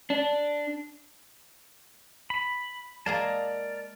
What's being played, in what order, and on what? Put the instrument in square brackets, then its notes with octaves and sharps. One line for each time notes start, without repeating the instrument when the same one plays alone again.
[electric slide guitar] D4
[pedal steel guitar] B5
[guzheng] G#3 A#3 G#4 [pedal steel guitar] A#4 D5 A5